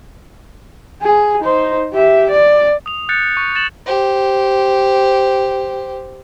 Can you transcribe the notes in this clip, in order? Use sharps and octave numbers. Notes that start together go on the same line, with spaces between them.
G#4
D#4 C5
G4 E5
D5
D#6 F7
F#6 G6 A6 C#7
C#6
A6 E7 F#7
G4 C5